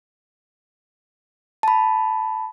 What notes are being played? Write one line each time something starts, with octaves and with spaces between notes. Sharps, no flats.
A5 B5